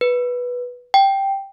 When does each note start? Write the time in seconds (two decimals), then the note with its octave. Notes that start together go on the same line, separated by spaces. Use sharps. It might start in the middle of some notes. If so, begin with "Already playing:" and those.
0.01 B4
0.94 G5